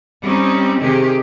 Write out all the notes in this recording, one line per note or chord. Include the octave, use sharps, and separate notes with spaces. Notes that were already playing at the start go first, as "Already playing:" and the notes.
G3 C4 C#4 D#4
C3 D#3 G4 G#4